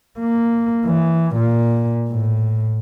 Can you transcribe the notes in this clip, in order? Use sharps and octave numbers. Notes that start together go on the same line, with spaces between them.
A#3
E3
A#2
A2